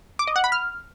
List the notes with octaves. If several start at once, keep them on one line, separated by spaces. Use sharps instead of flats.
D6
D#5
F#5
B5
F6